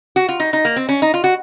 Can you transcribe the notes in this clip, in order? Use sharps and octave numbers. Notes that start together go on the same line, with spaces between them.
F#4
F4
D#4
D#4
A#3
C4
C#4
D#4
F4
F#4